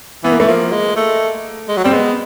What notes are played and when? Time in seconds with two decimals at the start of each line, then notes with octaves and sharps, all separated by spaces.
0.24 E3 B3
0.32 A#3
0.40 E3 A3
0.48 F3 A#3
0.72 G#3
0.96 A3
1.68 G#3
1.77 F#3
1.84 G3 C4
1.92 G#3 B3